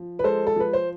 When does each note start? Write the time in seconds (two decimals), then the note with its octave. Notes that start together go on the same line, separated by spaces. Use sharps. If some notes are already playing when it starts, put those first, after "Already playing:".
Already playing: F3
0.19 B4
0.24 G#3 A4 C5
0.47 A4
0.56 F3 B4
0.73 C5